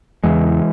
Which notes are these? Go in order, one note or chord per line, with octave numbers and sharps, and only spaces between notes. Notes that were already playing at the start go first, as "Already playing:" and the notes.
E2 C#3 E3 G#3